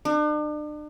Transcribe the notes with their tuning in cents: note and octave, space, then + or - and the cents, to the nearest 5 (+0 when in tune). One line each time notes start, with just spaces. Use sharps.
D4 +40